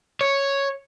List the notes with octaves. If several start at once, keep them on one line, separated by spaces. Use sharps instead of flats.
C#5